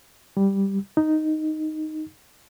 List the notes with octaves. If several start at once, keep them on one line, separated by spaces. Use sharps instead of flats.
G3
D#4